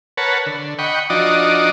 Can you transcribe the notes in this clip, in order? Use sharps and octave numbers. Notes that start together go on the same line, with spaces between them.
A#4 B4 C#5 F#5 A5
D3
D#5 F#5 G5 B5 C#6
F3 D4 D#4 F#4 D5 D#5